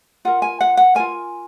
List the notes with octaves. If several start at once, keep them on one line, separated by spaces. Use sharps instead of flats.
F4 A#4 F#5
G#5
F#5
F#5
F4 A#4 G#5